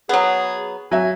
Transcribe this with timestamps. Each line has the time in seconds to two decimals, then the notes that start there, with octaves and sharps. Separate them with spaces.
0.09 F#3 B3 G#4
0.92 F#3 E5 G#5